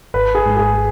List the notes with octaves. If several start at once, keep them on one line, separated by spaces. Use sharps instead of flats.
G#1 B4
G#4
G#2 G#3
G#4